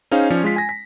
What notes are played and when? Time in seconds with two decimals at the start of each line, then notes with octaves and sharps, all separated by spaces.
0.11 C#4 D#4 G#4 C5 F5
0.30 F3 C#4 C#5 D5
0.44 G#3 F4 B6
0.56 G#5 A#6
0.69 B6